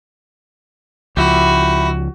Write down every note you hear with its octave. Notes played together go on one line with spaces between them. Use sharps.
C#2 F3 E4 F#4 G4